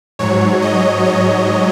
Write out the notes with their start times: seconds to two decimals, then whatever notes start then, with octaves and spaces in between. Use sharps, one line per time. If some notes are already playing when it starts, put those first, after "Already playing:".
0.19 G#2 F#3 C#5
0.62 D#5
1.05 C#5